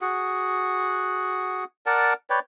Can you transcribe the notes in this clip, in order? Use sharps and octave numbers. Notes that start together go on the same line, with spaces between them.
F#4 G#4 F#5
A#4 D5 F#5 A5
B4 C#5 D5 G5